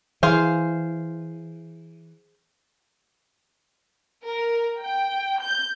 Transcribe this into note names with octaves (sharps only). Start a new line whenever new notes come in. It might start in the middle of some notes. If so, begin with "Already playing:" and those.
E3 G#4 C5 F5
A#4
G5
G6